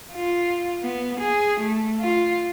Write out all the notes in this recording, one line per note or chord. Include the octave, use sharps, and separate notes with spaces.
F4
B3
G#4
A3
F4